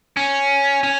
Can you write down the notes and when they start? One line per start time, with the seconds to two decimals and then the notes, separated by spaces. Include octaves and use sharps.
0.17 C#4
0.83 C#4